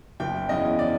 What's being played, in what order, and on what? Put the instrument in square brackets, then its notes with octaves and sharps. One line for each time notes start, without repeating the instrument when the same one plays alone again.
[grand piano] F#1 G5
E2 C#3 E3 D#5
D5